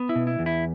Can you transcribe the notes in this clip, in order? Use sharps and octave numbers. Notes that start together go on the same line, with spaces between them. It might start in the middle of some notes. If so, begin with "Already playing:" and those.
Already playing: B3
E4
B2
E4
E2
E4